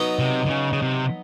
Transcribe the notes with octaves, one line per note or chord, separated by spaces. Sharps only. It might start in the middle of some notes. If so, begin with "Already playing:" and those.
Already playing: F#3 B3 D#4
C3
D3
C#3
C#3
C3